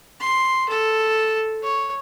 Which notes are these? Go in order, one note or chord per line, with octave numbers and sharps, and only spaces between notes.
C6
A4
C#5